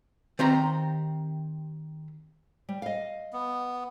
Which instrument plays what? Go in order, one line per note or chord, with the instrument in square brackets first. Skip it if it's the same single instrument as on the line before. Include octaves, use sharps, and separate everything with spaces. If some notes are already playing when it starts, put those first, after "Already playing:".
[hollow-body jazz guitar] D#3 C4 G4 A#5
[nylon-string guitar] G3
D#5 F5
[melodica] B3